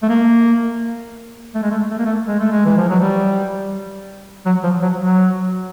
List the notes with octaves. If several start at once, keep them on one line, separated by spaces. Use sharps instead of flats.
A3
A#3
A3
G#3
A3
A3
A#3
A3
G#3
A3
G#3
E3
F3
F#3
G3
F#3
F3
F#3
F#3